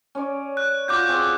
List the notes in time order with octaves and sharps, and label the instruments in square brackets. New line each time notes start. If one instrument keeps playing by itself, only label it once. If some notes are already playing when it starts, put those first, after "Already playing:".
[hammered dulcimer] C#4 C#5 D5
[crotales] F#6
[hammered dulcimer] F4 F#4 [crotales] D6 F#6 G6
[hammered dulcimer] C4 G#4